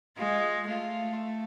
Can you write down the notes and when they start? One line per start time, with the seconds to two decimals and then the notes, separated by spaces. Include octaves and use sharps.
0.18 G#3 F4
0.68 A3 F4